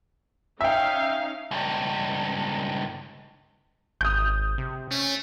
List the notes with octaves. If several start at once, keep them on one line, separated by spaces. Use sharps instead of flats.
C#4 D#4 E5 F5 G5
C#2 G2
G#1 D#6 G6
C3
A3 C#4